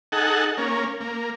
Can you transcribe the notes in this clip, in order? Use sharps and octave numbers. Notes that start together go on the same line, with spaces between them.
D#4 G#4 A4 F#5
A#3 C#4
A#3